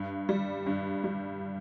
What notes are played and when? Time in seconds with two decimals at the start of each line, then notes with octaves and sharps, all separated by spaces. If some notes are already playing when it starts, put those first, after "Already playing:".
Already playing: G2
0.29 G3
0.66 G2
1.04 G3